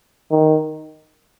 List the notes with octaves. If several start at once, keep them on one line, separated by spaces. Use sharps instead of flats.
D#3